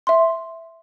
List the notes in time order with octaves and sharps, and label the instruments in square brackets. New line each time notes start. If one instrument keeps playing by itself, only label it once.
[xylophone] E5 C6